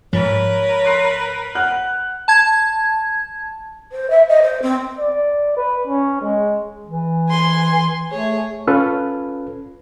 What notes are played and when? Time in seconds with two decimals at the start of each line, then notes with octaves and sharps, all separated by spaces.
0.13 G#2 F3 A#4 B4 C#5
0.84 C6 F#6 C7
1.55 F#5 F6 F#6
2.28 A5 G#6
3.92 C5
4.10 E5
4.29 D#5
4.42 C5
4.62 C4
4.99 D5
5.56 B4
5.87 C#4
6.22 G#3
6.86 E3
7.29 G#5 C6
8.11 A3 G#4 C#5
8.67 C#4 F4 A4 B4